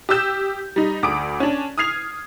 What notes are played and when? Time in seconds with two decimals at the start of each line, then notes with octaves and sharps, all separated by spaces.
0.09 G4 D#6 E6 G6 E7
0.76 G3 D#4
1.03 D2 D6 D#6 D7
1.40 C#4 D4
1.78 D#6 F6 G#6 C7 F7